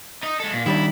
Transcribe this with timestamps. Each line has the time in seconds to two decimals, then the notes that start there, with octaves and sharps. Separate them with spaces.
0.23 D#4 D#5
0.40 G#3 A4
0.54 A#2
0.66 D#3 G3 D4 E4